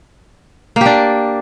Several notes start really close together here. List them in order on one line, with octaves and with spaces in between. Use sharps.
A#3 G4 D4